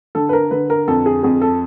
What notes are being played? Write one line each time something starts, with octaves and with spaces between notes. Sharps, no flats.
D3 A4
B4
A#4
D3 B4
A#4
F2 A4
G#4
F2 G#4
A4